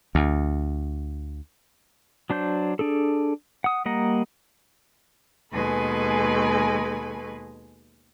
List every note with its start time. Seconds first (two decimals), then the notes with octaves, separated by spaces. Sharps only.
0.15 D2
2.30 F#3 D4 C5 G6
2.79 D4 G#4 A4
3.64 F#5 D#6
3.85 G3 A#3 D#5 F#5 A#5
5.52 D#2 B2 G#3 A4 B4 G#5